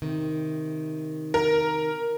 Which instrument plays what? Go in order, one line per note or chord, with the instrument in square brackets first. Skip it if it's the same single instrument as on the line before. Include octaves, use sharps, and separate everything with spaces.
[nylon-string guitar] C3 D#3
[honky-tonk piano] A#4